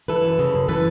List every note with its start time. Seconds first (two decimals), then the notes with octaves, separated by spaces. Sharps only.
0.08 E3 A4 B4
0.24 F#2
0.39 C#3
0.54 F#2
0.68 E3 A4 B4